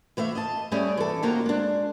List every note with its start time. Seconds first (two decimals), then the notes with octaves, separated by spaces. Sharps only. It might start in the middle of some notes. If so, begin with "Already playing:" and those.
0.17 E3 A3 E5 F5
0.35 D#5 A5
0.72 G3 A3 C#4 G#4 D5
0.97 E3 A4
1.23 C3 D#3 A#3 F4 F#4 A#5
1.46 G#3 D4